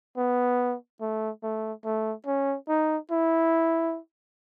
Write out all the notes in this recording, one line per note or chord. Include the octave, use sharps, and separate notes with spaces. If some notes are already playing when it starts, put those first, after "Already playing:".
B3
A3
A3
A3
C#4
D#4
E4